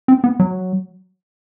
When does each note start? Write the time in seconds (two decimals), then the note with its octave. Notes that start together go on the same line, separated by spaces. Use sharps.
0.08 C4
0.24 B3
0.40 F#3